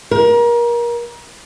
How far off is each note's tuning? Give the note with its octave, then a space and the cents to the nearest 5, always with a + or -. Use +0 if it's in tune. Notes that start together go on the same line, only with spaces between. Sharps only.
A#4 +30